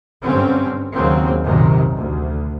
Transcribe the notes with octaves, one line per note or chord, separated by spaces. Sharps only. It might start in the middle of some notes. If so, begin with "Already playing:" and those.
G2 D3 C4 C#4
D#2 C#3 F#3 A#3 C4
A#1 F#2 C3 D#3
D2